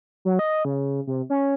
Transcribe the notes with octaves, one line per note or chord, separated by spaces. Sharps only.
F#3
D#5
C#3
C3
C#4